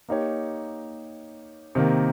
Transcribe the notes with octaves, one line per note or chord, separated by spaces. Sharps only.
A#3 D#4 G4 C#5
C3 D#3 A#3